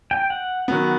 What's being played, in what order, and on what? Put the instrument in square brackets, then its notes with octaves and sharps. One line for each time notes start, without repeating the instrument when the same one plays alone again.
[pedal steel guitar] G5
F#5
[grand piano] D#3 F#3 B3